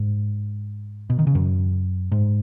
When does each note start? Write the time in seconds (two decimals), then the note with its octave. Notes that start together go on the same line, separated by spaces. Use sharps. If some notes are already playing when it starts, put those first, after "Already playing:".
Already playing: G#2
1.10 B2
1.19 D#3
1.27 C#3
1.35 F#2
2.12 G#2